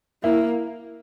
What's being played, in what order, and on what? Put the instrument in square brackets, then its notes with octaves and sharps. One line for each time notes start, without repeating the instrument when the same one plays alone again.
[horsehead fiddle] A#3 [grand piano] E4